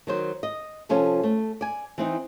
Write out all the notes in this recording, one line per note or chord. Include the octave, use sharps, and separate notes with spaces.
D#3 F#3 C5
D#5
C3 F3 C#4 F4 A4
A3
D5 G#5
E3 C4 D#4